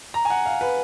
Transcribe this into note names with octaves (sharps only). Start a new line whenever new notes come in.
A#5
G#5
F#5
F5
B4